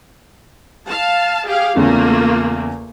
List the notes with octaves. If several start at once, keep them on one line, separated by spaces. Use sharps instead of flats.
F5 A5
G4 G#4 F5
E2 C#3 A3 A#3 F4